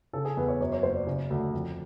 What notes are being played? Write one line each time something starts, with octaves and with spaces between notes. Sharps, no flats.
C#3 A4
G#4
E2 B4
C#5
F#2 C#5
C#5
F#1 C5
D5
C#3
D2
F2